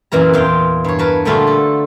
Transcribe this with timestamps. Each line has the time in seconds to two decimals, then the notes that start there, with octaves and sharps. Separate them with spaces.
0.12 F#2 A#2 E3 A#4 A#5
0.33 E2 A#2 F4 G5
0.84 G2 C#5
0.99 A#4 B4 A5
1.25 A#2 D3 G3 A3 F4 F#4
1.47 A4